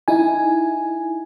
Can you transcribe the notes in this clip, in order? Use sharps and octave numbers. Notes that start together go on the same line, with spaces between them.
D#4 E4 G#5